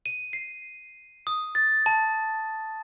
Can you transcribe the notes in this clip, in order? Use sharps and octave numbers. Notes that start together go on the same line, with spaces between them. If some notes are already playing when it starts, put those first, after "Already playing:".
D#7
C7
D#6
A6
A5